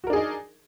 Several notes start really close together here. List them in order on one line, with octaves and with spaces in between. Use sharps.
F#4 A#4 D4 G#4 D#4